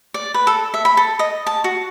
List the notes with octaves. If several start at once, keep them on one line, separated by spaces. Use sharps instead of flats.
D5
B4
A4
E5
B5
A4
D#5
A5
F#4